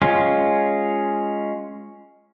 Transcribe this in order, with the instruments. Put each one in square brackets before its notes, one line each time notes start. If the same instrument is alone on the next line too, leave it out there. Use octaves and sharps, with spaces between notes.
[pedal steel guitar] G#3 C#4 F4